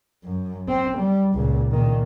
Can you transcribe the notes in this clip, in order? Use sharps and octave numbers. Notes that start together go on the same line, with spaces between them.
F#2
C4
G3
C#2 A#2
A#2 D#3